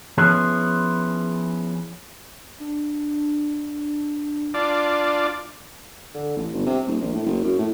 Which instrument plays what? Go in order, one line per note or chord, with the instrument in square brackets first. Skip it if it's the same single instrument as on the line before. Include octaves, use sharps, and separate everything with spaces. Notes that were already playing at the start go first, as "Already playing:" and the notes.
[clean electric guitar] F3 B3 C#4 E4 G#4
[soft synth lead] D4
[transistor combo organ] D4 F4 D5
[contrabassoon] D3
A1
G1
C3
D#1
A#1
A2
F#1
F#2
A2